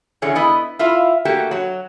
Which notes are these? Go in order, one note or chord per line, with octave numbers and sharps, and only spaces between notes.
D3 E3 C#4 G#4 C#5
B3 E4 D#5
E4 F4 E5 F5
A3 A#3 F#4 G4
F#3 F#4